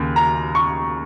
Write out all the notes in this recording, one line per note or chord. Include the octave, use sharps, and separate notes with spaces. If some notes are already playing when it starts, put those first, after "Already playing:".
Already playing: D#2 C#3
A#5
C#6